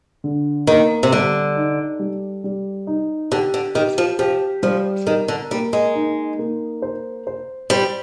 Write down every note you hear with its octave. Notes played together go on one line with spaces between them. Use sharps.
D3
D#3 A#3
C3
D3 G3
D#4
G3
G3
D#4
D3 G4
D3
D#3 G4
F3
F3 G4
F3 G3
D#3 A#4
D3
G3 A#3
G#3
D#4
A#3
C5
C5
G3 C5